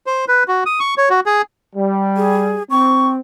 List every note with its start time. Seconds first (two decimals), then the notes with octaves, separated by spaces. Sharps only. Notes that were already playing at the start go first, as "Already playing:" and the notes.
0.06 C5
0.28 B4
0.48 F#4
0.66 D#6
0.80 C#6
0.98 C#5
1.10 F#4
1.26 G#4
1.75 G3
2.17 G#4
2.70 C4 C#6